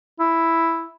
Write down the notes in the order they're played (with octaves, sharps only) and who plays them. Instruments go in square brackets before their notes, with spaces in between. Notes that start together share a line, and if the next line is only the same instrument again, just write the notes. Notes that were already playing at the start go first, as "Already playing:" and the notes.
[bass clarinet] E4